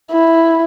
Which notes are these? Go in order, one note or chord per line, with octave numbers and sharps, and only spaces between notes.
E4